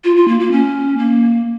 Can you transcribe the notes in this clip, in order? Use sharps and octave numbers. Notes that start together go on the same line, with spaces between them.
F4
F4
A#3
A#3
C#4
A#3